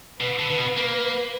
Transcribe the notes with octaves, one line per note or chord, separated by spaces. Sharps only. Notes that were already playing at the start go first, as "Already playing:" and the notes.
B2 B4
D3
D3
B2
A#3